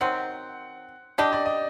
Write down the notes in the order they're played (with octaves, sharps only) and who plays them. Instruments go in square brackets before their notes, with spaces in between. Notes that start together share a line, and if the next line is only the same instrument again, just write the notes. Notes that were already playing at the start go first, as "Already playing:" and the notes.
[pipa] D#3 F#3 C4 [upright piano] F#5
[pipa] G3 D4 G4 [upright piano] D#5
[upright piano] D5
D#5